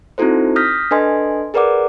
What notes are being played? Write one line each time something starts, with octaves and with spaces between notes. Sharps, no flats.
C4 D#4 E4 F#4 A4 C5
D#6 F6 G6 A#6 B6
D4 A4 B4 D#5 G#5 C6
G#4 A#4 B4 D5 F#5 D6